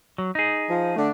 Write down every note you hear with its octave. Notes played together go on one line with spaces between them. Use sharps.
F#3
D#4 G#4
F3
D3 A3 D4